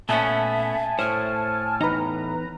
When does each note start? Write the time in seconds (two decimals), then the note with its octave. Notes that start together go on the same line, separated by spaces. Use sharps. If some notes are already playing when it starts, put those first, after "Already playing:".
0.09 A#2 A3 B3 C#4 E5 G#5 A5
0.99 A2 C5 C#5 F6
1.81 E2 D#4 B4 D#5 A#5